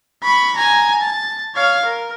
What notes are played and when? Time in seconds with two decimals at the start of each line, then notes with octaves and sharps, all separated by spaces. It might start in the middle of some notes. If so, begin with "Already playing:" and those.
0.23 B5 C#6
0.56 G#5 A#5
1.02 A5
1.55 C#5 F5
1.85 A#4